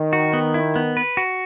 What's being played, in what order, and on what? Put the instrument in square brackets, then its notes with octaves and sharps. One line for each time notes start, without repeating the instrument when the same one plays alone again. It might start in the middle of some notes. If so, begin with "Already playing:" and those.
Already playing: [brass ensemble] D#3
[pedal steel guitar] F#4
B3
E4
B3
B4
F#4